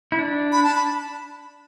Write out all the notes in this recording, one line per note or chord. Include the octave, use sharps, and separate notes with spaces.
E4
D4
B5
A5
B5